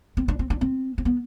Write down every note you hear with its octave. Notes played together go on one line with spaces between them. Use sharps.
C4
D4
C4
D4
C4
C4
B3